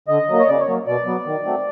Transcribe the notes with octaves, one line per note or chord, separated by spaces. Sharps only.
D3 D#5
F#3 A#3
C#5
C#3 D5
C#5
F#3 A#3
B2 D5
F#3 B3
D#3
F#3 A3 C4